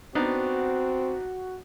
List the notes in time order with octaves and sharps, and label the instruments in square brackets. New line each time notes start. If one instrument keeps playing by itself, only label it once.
[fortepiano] B3 D4 D#4 [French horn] C4 [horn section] F#4